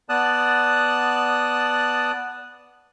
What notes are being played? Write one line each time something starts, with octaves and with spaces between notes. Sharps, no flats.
B3 D5 A5 D#6 F#6